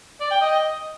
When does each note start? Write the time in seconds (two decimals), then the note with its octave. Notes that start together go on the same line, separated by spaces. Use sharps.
0.21 D5
0.31 G5
0.41 D#5